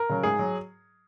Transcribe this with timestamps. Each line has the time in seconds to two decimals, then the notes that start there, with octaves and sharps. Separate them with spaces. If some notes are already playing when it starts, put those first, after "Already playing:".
Already playing: A#4
0.09 C#3 F#3
0.23 G#2 G#4
0.39 F#3